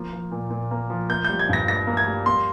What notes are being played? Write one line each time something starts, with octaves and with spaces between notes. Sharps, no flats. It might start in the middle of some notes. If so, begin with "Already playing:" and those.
Already playing: F3 A#3
F3
A#2
A#2
A#3
F3
A#3 G6
G3 G6
G#6
G2 A#6
G2 A#6
A#3
G#6
G3
A#3 C6